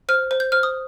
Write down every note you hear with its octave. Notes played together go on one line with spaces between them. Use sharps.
C5 F6
C5
G6
C5 F6
D#6